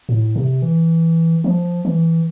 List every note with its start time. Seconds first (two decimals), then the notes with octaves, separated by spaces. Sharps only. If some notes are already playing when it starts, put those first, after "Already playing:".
0.09 A2
0.36 C3
0.62 E3
1.44 F3
1.85 E3